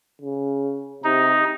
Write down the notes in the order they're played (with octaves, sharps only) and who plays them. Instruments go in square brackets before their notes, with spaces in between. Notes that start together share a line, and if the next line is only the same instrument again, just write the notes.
[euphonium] C#3
[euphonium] C3 [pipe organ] D#4